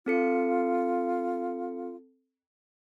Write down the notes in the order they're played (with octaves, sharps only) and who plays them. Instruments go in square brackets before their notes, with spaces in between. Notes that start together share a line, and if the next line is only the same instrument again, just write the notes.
[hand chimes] C4 A4 C#7 [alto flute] F4